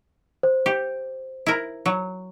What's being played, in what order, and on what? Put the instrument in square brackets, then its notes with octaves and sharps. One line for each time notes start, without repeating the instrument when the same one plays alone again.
[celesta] C5
[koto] G4
E4 A#4
F#3